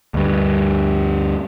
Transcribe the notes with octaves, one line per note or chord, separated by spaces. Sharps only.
D2 G2